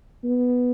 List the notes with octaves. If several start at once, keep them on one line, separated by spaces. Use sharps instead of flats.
B3